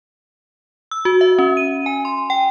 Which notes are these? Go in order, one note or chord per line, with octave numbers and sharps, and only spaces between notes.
E6
F#4
E5
C#4
D#7
G#5
C6
G5